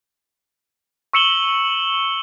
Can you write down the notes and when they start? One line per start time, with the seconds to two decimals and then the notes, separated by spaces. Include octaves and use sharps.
1.13 C#6 E6 C#7 E7 F#7 G7